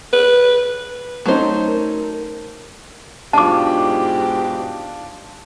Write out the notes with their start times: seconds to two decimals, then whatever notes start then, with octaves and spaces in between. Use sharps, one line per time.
0.13 B4
1.26 F#3 A3 C#4 D#4 C5
1.68 A#4
3.33 G#2 B2 D4 F4 G4 A5 D6